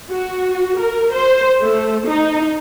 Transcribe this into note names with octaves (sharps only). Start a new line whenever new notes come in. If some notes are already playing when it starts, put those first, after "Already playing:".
F#4
A#4
C5
A3
D#4